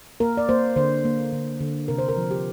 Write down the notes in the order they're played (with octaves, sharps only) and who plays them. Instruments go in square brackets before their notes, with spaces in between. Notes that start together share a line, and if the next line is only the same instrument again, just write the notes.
[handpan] A#3 A#4
D5
A#3 C5
D3 C5
A#3
D3
D3
C3 A#4
C5
A#4
F3
G4